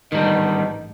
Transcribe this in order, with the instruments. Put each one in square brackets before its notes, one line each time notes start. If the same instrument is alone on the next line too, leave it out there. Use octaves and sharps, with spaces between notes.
[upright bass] A1 G#2 [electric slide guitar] D#3 G3 [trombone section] B3 D4 D#4 [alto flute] D#5